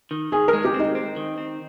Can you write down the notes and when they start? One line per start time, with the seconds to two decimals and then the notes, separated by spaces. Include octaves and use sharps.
0.11 D#3
0.32 D#3 G#4
0.48 A#4
0.53 G#3
0.65 G4
0.74 C4
0.80 D#4
0.95 C4
1.16 D#3
1.38 C4